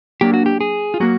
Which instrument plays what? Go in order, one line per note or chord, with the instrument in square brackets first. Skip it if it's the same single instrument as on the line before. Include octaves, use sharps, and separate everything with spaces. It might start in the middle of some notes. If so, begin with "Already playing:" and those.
[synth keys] F#3 A#3 D4 [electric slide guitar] G4
[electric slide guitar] F#4
G4
G#4
F4
[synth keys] F#3 A#3 [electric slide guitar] F#4